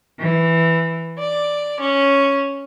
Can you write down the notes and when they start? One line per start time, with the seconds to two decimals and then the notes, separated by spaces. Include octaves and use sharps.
0.19 E3
1.20 D5
1.82 C#4